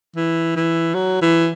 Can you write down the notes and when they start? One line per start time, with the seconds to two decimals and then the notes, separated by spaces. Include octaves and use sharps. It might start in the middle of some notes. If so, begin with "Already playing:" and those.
0.16 E3
0.56 E3
0.95 F#3
1.22 E3